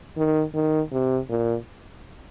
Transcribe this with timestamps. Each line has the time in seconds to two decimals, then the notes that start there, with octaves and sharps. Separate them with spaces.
0.17 D#3
0.54 D#3
0.92 C3
1.29 A#2